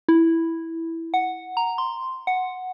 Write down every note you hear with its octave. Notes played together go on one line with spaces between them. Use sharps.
E4
F#5
A#5
C6
F#5